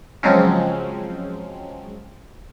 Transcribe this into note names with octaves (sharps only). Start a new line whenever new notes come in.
C#3 F3 F#3 G#3 C4 C#4